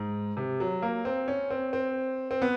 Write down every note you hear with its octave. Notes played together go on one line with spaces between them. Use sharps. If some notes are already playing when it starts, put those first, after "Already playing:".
Already playing: G#2
C3
F#3
A#3
C4
C#4
C4
C4
C4
B3